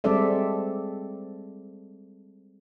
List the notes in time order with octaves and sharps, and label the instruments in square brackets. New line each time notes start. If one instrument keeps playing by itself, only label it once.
[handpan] G3 G#3 C4 A4 D5 E5